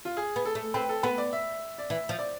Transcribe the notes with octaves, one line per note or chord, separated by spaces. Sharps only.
F4
G#4
B3
A4
A3
C4 B4
A4
B3 B4
D5
E5
D5
E3 E5
F3
D5